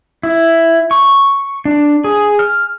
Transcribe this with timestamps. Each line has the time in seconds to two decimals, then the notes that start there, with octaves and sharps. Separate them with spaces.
0.23 E4
0.91 C#6
1.65 D4
2.04 G#4
2.39 F6